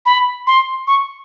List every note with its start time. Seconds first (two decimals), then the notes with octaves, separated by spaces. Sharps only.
0.05 B5
0.47 C6
0.87 C#6